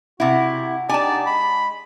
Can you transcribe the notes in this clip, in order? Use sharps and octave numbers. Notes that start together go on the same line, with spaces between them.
C3 E4 F#4 F#5
D4 D#4 G4 D5 G#5 A5
G#3 B5